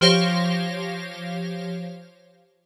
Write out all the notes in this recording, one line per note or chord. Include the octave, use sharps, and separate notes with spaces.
F3 G4 C5 C#5 F5 A#6